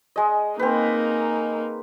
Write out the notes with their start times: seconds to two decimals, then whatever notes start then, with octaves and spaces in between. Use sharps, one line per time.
0.16 G#3 D#5
0.59 A#3 C4 D#4 B4